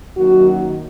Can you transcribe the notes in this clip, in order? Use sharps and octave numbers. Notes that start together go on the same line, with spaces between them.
F#2 D#3 F#3 A#3 F#4